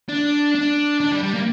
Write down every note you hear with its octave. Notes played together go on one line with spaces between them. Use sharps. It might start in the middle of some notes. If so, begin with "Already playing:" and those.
D4
D4
D4
G3
G3
A#3